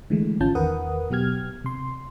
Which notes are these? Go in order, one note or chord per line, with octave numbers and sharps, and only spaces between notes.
D3 E3 G#3 A3
G#1 C#4 F4 A5 G6
E2 D#3 A#4 B4 F#5 D#6
B2 F#3 B3 G4 F6 G#6
C3 C6